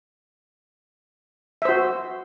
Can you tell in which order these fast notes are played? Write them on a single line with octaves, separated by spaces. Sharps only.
E5 C5 F#4